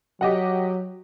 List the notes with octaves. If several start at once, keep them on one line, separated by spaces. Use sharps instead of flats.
F#3 G4 D#5 F#5